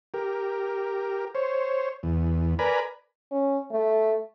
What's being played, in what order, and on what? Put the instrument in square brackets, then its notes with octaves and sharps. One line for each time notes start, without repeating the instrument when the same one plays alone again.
[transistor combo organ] G4 A#4
C5 C#5
E2
A#4 B4 D5 G#5 A#5 B5
[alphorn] C#4
A3